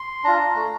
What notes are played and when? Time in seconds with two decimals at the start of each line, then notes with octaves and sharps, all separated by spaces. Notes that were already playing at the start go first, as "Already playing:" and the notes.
Already playing: C6
0.24 D4 F4 A#5
0.55 A3